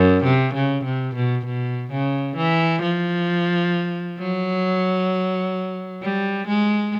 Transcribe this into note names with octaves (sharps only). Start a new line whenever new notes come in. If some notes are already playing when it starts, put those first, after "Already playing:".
Already playing: F#2
C3
C#3
C3
B2
B2
C#3
E3
F3
F#3
G3
G#3